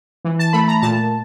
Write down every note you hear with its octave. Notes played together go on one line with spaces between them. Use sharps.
E3
A5
A3 B5
A#5
A#2 A5